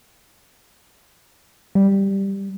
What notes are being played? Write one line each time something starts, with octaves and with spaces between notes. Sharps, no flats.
G3